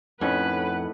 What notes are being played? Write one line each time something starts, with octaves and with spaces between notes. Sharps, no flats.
F2 A2 D#3 C#4 B4 F#5